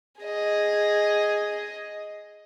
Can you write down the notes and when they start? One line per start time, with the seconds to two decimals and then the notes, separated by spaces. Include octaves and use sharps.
0.20 G#4 D#5